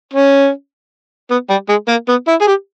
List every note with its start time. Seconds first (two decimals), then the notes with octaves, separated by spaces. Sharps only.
0.14 C#4
1.31 B3
1.50 G3
1.69 G#3
1.88 A#3
2.09 B3
2.28 E4
2.41 G#4
2.47 G4